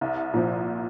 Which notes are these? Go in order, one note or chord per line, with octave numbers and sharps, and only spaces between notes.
C2
A#2 F3